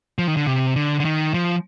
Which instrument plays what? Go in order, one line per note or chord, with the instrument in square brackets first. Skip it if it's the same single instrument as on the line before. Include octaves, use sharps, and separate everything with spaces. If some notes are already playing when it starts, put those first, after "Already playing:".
[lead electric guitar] F3
D#3
D3
C3
D3
D3
D#3
F3